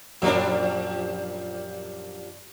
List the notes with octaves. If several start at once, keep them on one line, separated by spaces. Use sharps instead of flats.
F#2 A#2 F3 G3 D4